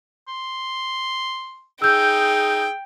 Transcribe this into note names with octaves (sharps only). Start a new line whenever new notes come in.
C6
D#4 G#4 G5 E6 G6